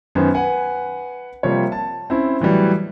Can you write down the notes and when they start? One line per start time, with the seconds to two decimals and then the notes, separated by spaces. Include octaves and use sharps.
0.15 F#2 D#3 B3 C#4 C5 G#5
0.34 B4 F#5 G#5
1.43 C3 F3 G3 A#3 C#5
1.72 A5
2.10 C4 C#4 E4
2.40 A2 E3 F#3 G3